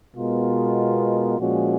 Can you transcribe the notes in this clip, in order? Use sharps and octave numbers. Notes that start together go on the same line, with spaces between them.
B2 G#3 B3 F4 A#4
A#2 F3 G#3 C#4 F#4